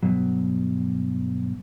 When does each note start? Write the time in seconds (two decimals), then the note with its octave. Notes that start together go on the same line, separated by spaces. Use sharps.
0.03 G2 B2 F#3